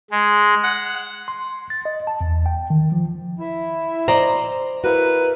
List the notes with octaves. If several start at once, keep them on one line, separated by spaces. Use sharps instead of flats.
G#3
F#5
C6
A6
D#5
A5
E2
G5
D#3
F3
E4
C5 D5 D#5 A#5
E4 F#4 A#4 B4